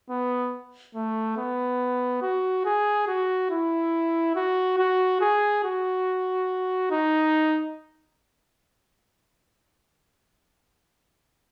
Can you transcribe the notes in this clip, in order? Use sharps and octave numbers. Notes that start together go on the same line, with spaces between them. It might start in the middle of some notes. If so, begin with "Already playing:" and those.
B3
A3
B3
F#4
G#4
F#4
E4
F#4
F#4
G#4
F#4
D#4